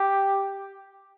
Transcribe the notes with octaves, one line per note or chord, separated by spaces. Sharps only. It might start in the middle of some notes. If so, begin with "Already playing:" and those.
Already playing: G4